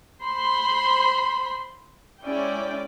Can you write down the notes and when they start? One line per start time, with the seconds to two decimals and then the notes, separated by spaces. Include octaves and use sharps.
0.22 C5 B5 C6
2.22 G#3 C#4 E4 D5 G5